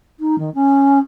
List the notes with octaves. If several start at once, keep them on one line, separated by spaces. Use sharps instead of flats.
D#4
D#3
C#4